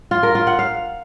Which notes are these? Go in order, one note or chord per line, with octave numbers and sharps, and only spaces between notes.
F4
A#4
F4
F#5
F5